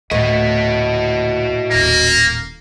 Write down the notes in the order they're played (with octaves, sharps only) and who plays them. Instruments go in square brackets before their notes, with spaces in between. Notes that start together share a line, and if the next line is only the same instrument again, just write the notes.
[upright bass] D2 [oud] A2 [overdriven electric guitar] F#4 D#5
[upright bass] D#1 A1 [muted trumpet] A#3